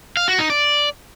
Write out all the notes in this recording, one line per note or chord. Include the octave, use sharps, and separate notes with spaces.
F5
F#4
D#4
D5